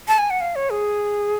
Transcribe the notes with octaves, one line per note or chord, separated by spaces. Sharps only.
A5
G#5
F#5
F5
C#5
G#4